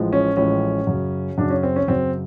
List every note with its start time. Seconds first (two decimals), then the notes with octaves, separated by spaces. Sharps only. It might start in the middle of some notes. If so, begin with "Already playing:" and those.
Already playing: A1 A2 F3 G#3
0.13 C#4
0.37 A1 A2 F3 G#3 C#4
0.87 F#2 C#3 F#3
1.38 F#2 C#3 F#3 D4
1.50 C#4
1.63 C4
1.76 C#4
1.88 F#2 C#3 F#3 C4